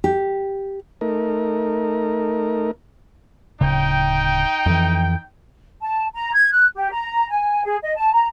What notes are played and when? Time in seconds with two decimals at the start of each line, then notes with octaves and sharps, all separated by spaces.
0.04 G4
1.01 A3 D#4 A#4
3.61 D1 C#3 D#4 G5
4.66 F2 E3
5.81 A5
6.14 A#5
6.33 G#6
6.52 F#6
6.75 G4
6.91 A#5
7.30 G#5
7.64 G#4
7.83 D#5
7.96 A5
8.12 A#5